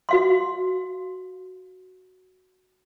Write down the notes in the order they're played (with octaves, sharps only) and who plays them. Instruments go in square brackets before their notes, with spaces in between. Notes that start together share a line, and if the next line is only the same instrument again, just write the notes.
[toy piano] F#4 F5 C6